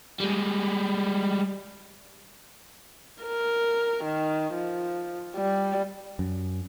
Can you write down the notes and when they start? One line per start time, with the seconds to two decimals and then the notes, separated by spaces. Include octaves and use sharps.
0.20 G3 G#3
3.23 A#4
4.04 D#3
4.53 F3
5.36 G3
6.19 F#2